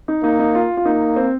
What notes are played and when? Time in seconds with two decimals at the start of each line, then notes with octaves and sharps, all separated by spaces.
0.08 D#4
0.23 A#3 D#4
0.39 D#4
0.55 F4
0.77 F4
0.85 A#3 D#4
1.16 C4